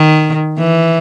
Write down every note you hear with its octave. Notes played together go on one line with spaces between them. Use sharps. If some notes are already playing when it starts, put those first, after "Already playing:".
Already playing: D#3
E3